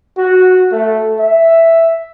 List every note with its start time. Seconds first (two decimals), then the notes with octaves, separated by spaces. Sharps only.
0.18 F#4
0.72 A3
1.20 E5